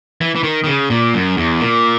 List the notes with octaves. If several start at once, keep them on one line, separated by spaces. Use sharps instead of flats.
E3
E3
D#3
D#3
C#3
A#2
F#2
E2
A#2